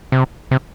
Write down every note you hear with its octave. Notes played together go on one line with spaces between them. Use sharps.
C3
C3